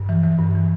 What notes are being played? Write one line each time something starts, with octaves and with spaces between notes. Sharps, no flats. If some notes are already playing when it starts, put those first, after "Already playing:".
Already playing: G2
E3
E3
G2
E3